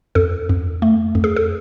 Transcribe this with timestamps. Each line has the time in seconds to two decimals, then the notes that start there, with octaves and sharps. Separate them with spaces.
0.15 F2 A4
0.49 F2
0.82 A3
1.15 F2
1.24 G#4
1.36 A4